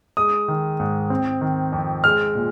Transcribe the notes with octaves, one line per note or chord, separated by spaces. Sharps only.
G#3 D#6
D#3
G#2
C4
D#3
F2
G#3 F6
A#2